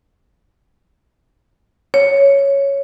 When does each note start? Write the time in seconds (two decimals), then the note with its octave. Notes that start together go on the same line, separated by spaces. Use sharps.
1.94 C#5